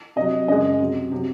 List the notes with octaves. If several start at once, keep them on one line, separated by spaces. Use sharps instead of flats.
C3 F#3 D#5
F#2 C#3 G#3 D#5
C3 F#3
C3 F#3